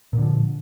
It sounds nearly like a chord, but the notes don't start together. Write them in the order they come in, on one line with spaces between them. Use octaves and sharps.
A#2 D3 F3